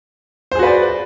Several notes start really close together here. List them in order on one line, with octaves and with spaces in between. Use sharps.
C5 G#4 F#4 B4 D5